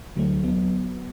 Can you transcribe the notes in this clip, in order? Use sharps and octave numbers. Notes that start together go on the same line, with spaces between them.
D2 D3 F#3 A3
F#3 B3